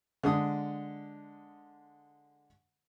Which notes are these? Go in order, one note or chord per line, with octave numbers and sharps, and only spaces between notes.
D3 G#3 D#6